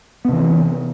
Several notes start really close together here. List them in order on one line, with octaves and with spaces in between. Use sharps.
B3 C3 E3